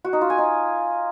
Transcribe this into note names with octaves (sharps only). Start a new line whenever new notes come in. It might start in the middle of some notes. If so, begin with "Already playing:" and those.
F#4
D#4
F4
G#5
D#4